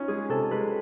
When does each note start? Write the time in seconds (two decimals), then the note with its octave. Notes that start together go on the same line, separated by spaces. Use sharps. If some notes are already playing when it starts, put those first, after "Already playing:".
Already playing: C#4 D#4 F4
0.08 G#3 G#4
0.29 C3 A4
0.51 G#3 B4